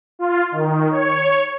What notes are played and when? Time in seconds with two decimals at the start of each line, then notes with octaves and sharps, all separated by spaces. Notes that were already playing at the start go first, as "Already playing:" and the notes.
0.19 F4
0.52 D#3
0.91 C#5